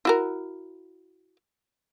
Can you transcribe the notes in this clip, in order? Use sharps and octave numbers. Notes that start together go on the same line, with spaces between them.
E4 F#4 A#4